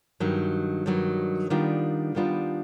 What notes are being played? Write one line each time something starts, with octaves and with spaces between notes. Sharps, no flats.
G2 D#3 F#3
G2 D#3 F#3
D#3 G3 B3 D4 F4
D#3 G3 B3 D4 F4